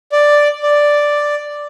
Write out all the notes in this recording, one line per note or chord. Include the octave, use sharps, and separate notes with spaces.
D5
D5